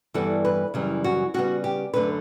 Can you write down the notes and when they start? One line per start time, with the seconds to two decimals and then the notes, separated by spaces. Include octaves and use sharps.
0.14 G2 E3 G3 B3 A4
0.45 B4
0.74 F#2 C#3 E3 G3
1.04 F#4
1.34 C#3 G3 B3 F#4
1.64 G4
1.94 F#2 D3 A3 B4